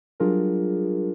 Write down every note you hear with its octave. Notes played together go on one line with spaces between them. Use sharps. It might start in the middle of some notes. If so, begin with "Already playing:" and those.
F#3 G3 D4 F4 G#4 A#4